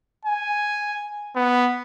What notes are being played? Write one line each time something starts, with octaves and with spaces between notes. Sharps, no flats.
G#5
B3